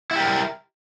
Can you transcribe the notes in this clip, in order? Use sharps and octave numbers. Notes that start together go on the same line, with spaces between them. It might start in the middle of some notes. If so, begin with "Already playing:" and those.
E4 G4 A#4